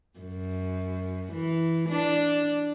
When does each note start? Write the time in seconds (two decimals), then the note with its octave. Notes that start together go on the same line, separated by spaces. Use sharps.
0.19 F#2
1.33 E3
1.89 D4